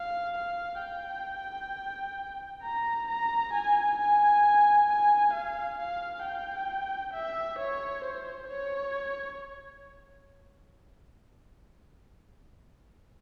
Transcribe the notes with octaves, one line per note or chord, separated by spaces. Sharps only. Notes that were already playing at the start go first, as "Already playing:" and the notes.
Already playing: F5
F5
G5
A#5
A#5
G#5
G#5
G#5
F5
F5
G5
E5
C#5
C5
C#5